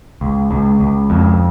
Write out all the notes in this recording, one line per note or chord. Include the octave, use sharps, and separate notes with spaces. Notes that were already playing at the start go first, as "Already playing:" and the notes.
C#2
C#2
C#2
F2